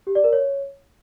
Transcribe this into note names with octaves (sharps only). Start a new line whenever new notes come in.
G4
D5
A#4
C#5